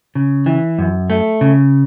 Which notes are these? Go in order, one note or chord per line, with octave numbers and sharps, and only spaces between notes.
C#3
E3
F#2
A3
C#3